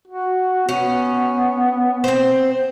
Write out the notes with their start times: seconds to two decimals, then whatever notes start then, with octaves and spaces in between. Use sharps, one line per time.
0.08 F#4
0.69 B3 C#4
2.04 C4 C5